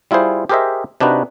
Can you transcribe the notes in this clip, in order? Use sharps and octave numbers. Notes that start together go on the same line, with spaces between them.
G3 E4 F4 G#4 C5
G4 G#4 A#4 C5 D#5 E5
C3 D4 D#4 F#4 B4